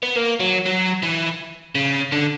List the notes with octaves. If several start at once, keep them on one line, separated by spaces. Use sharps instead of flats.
B3
A#3
F#3
F#3
E3
C#3
D3